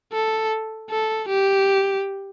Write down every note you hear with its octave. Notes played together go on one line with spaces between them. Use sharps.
A4
A4
G4